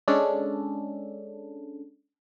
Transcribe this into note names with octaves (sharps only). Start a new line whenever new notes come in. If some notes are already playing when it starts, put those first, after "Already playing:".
G#3 C#4 D4 A4